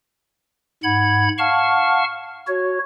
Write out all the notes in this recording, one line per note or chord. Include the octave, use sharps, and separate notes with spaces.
G#2 F#5 B5 G#6
F5 F#5 A5 C#6 F6
F#4 C#5